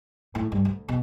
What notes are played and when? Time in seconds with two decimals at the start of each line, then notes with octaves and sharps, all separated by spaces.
0.35 A2
0.52 G2
0.65 D2
0.88 B2